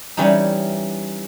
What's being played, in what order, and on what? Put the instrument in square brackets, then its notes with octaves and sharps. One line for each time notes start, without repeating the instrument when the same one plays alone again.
[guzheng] E3 G3 C#4 D#4